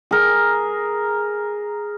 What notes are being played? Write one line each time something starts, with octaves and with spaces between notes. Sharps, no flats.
G#4 A#4